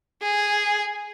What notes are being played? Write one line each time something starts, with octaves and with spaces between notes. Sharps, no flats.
G#4